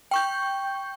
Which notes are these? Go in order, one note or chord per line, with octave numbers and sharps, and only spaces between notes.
G5 C#6 G6